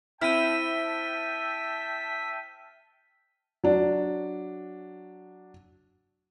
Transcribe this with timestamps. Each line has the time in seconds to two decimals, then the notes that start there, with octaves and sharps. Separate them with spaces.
0.21 C4 E4 E5 G5 A5 F6 B6 D#7
3.64 F#3 D4